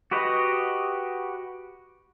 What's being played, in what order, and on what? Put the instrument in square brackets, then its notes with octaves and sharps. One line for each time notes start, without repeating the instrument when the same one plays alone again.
[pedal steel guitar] F#4 G4 B4 D#5